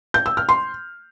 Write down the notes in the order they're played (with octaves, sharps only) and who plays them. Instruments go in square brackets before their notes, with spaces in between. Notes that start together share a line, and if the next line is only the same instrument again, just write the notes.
[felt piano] G6
E6
F6
C6